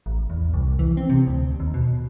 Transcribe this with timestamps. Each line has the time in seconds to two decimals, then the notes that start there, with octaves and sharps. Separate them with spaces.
0.06 A1
0.30 E2
0.54 C2
0.79 E3
0.97 C4
1.10 C3
1.27 D2
1.60 D#2
1.74 B2